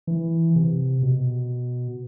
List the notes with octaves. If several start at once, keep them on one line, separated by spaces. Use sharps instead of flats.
E3
C3
B2